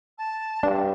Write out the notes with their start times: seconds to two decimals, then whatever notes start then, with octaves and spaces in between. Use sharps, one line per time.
0.18 A5
0.63 G2 D4